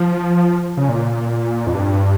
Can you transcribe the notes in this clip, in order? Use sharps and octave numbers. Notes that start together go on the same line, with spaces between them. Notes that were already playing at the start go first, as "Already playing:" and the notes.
Already playing: F3
C#3
A#2
F2
G2